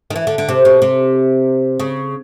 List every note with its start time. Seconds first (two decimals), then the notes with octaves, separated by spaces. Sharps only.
0.10 D#3
0.16 E3
0.27 D3
0.38 D3
0.49 C3
0.65 B2
0.82 C3
1.80 C#3